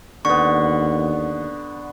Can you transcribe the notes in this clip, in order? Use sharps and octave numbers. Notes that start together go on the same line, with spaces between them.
D#2 D3 B3 C#6